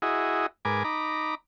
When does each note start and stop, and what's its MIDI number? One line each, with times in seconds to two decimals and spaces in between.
0.02 0.46 64
0.02 0.46 66
0.02 0.46 68
0.02 0.46 75
0.65 0.83 44
0.65 0.83 70
0.65 0.83 71
0.65 0.83 80
0.65 0.83 86
0.84 1.35 63
0.84 1.35 82
0.84 1.35 83
0.84 1.35 86